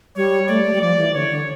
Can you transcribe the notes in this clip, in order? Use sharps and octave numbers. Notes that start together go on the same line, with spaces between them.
G3 C#5
A3 D5
A3
G3
F3 D5
E3
D3 C#5
D3